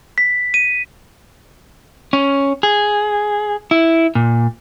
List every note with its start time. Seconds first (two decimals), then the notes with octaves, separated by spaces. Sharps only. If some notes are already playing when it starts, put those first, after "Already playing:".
0.18 B6
0.54 D#7
2.13 C#4
2.63 G#4
3.71 E4
4.15 A#2